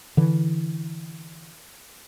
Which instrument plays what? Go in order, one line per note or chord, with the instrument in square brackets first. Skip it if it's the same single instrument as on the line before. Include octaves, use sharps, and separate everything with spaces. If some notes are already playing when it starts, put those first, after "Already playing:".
[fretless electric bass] D3 E3